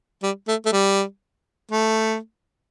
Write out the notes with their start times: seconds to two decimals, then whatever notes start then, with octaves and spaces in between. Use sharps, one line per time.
0.23 G3
0.48 A3
0.66 A3
0.73 G3
1.71 A3